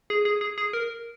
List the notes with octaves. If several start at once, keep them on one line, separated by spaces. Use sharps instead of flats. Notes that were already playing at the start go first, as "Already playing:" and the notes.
G#4
G#4
G#4
G#4
A#4